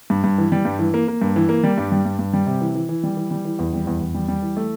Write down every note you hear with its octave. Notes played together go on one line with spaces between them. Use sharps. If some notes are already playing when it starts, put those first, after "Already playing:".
G2
G2
E3
G3
G2
E3
A#3
A#3
G2
E3
A#3
G3
G2
G3
G2
G2
G3
C3
E3
E3
E3
G3
E3
G3
E3
E2
G3
E2
E2
G3
G3
E3
A3